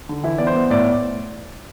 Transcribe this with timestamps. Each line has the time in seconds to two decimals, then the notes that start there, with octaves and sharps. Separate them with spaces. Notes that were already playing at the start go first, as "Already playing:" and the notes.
0.09 D3
0.24 E3 E4
0.38 B3 D5
0.47 C5
0.55 B3
0.70 A2 D5